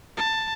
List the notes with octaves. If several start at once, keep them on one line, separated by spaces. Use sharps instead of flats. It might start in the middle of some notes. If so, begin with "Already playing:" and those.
A5